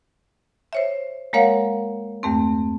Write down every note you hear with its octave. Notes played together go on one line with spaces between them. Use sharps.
C5 C#5 E5
G#3 A#3 A#4 C#5 F5 F#5
E2 G2 A3 C4